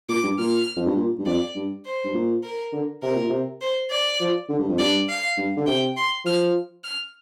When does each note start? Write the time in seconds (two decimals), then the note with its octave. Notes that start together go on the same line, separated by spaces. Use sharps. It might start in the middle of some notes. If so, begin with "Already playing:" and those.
0.09 A#2 D6
0.23 G2
0.38 A#2 F6
0.77 F2
0.86 G2
0.97 A#2
1.18 G2
1.26 F2 D5
1.56 G2
1.85 C5
2.04 G2
2.14 A#2
2.43 A#4
2.73 D3
3.02 C3 A#4
3.16 A#2
3.29 C3
3.61 C5
3.91 D5
4.20 F3
4.49 D3
4.59 G2
4.69 F2
4.79 G2 D5
5.09 F5
5.37 G2
5.57 D3
5.66 C3 G5
5.97 C6
6.25 F3 F6
6.84 F6